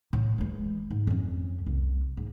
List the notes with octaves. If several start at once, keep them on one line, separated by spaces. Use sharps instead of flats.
A2
E3 G#3
G#2
F2 C#4
C2
G#2